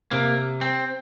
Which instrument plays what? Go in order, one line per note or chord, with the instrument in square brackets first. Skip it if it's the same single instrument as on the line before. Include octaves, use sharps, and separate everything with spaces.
[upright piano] C3 [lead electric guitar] A#3
[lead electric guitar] C4